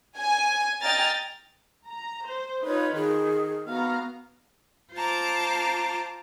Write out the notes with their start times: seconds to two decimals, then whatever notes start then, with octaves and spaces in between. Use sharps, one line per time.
0.19 G#5
0.82 D#5 G5 G#5 A#5 F6 A6
1.89 A#5
2.27 C5
2.65 D#4 F4 B4 C#5
2.96 D#3 G#4
3.68 B3 F#4 F5 A#5
4.94 F4 C5 A5 A#5 D6